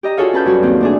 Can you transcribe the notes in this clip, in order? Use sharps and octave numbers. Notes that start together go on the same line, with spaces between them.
G4 D#5 A#5
F4 F#4 G#4 A4 C#5 F5
C#4 B4 A5 G6
G2 F#3 F#4
D#2 C4 C5
A2 D4 G#4